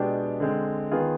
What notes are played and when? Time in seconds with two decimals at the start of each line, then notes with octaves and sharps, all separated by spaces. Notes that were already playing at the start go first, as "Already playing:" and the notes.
Already playing: B2 G#3 D4 G4
0.40 D3 G#3 C4
0.92 D#3 B3 F4 G#4